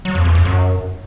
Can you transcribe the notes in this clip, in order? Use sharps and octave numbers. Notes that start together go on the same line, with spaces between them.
F#3
F2
E2
F2
F#2